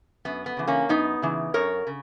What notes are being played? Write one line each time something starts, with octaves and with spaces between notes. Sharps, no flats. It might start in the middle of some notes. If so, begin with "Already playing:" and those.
F#2 B3
B3
C#3 E3
A#3 C#4
F#2 B3 D#4
C#3 E3
F#2 A#4 C#5
C#3